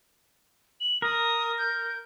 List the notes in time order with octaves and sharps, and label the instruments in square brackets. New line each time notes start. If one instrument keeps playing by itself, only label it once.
[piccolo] F#7
[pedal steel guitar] A#4 [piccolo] D#6
[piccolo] G6